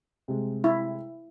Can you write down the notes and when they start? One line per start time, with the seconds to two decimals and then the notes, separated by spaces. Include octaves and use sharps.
0.28 C3 G3 G#3
0.64 E4